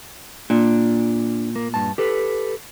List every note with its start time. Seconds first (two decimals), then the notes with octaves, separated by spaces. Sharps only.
0.50 A#2 D4
1.56 A#3
1.74 G2 A5
1.98 G4 A4 B4